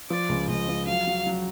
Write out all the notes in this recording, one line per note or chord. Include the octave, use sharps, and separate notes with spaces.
F3 D5
C#2
C#2 D#5
F3
F#3 F5
F#3
F#3